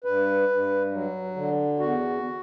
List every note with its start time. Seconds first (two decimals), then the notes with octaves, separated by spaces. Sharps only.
0.04 G2 B4
0.49 G2
0.92 F#3
1.36 D3
1.80 E2 F#4